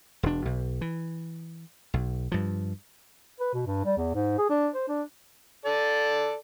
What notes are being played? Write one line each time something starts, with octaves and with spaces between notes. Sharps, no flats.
E1 D4
B1
E3
B1
G2 F3
B4
B2
G2
G3
E2
G#2
G#4
D4
C5
D4
A4 D5